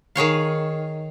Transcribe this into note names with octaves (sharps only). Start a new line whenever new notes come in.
D#3 G#4 C#5 F5